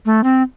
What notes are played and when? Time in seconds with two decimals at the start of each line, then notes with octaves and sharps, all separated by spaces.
0.06 A3
0.24 C4